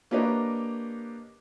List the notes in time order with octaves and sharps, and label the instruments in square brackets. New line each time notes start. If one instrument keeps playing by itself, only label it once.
[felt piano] A#3 D4 G4 B4 C#5 D#5